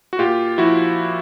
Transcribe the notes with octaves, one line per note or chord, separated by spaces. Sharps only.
F#4
A#2 F4 G4
F3 E4 F#4